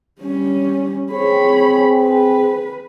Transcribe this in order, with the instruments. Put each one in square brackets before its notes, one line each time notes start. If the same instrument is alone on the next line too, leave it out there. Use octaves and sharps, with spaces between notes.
[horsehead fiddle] G3 C#4
[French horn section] C4 G#4 [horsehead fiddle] C#5 B5
[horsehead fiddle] B4